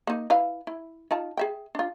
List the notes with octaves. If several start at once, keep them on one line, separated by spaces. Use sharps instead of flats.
A#3 D#4
E4 B4 F5
E4
D#4 F4 A5
G#4 E5 G5
D4 F4